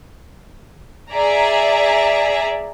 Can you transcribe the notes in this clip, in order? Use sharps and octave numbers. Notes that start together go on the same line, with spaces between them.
G#4 D5 E5 A#5